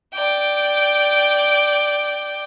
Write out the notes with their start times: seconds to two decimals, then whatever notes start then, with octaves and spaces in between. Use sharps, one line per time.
0.14 D5 G5